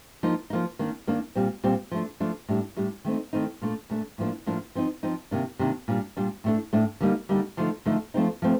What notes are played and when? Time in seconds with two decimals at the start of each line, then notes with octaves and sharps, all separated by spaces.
0.23 F3 A#3 D#4
0.50 F3 A#3 D#4
0.79 D#3 A#3 D4
1.07 D#3 A#3 D4
1.35 A#2 G3 C4
1.64 A#2 G3 C4
1.91 F3 A3 D4
2.20 F3 A3 D4
2.49 A2 G3 D4
2.76 A2 G3 D4
3.05 D#3 A3 C4 D#4
3.33 D#3 A3 C4 D#4
3.62 A#2 A3 D4
3.90 A#2 A3 D4
4.18 A2 F3 A#3 D4
4.46 A2 F3 A#3 D4
4.75 F3 C4 D#4
5.03 F3 C4 D#4
5.31 C3 D#3 A#3 D4
5.59 C3 D#3 A#3 D4
5.88 A#2 G3 D4
6.17 A#2 G3 D4
6.44 A2 A3 D4
6.73 A2 A3 D4
7.00 D3 G3 A#3 D#4
7.29 D3 G3 A#3 D#4
7.57 D3 F3 A3 D#4
7.86 D3 F3 A3 D#4
8.14 F3 A3 C4 D#4
8.42 F3 A3 C4